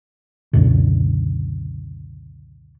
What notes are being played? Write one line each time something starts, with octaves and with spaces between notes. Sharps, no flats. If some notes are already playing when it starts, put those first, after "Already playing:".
C#2 F#2 B2 D3